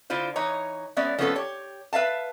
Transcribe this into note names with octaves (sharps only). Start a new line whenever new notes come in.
D3 E4 F4 C5
E3 D#4 C#5 A#5
G#3 B3 C#4 D5 E5
F3 A3 B3 C#4 E4 A4
G4 C#5
B4 E5 F5 A5